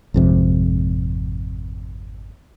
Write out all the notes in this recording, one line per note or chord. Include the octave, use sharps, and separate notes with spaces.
G#1 F2 C3